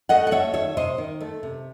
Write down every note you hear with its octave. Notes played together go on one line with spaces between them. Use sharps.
A3 D#5 F#5
F#5
A3 C#5 E5
D#3 C#5 E5
C3 C5 D#5
D#3
A3
C3